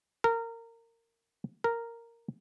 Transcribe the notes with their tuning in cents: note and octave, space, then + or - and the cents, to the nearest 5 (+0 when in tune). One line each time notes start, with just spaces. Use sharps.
A#4 -20
A#4 -5